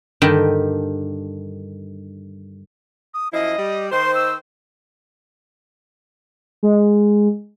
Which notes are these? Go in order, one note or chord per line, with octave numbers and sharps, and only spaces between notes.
G2 D3 D#3 G4 G5
D#6
F#2 F3 E4 D#5
G3
D#3 C5 C6
E6
G#3